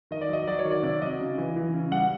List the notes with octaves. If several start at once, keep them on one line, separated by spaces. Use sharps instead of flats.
D#3 D#5
D5
F#3 D#5
F#3 D5
C#5
D#3
D5
C3 D5
F#3 D#5
C#3
E3
E3
C#3
G3 F#5